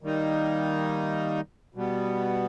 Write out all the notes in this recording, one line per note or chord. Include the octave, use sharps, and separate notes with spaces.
D#3 G3 A#3 D#4
B2 G3 B3